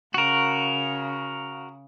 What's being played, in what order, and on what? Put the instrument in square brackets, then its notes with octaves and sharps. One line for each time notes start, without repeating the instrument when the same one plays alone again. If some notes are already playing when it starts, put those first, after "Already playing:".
[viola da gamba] C#3 [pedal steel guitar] F#4 A#4